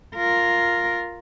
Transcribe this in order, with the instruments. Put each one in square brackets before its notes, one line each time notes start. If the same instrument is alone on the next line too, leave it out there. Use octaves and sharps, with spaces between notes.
[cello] F4 A#4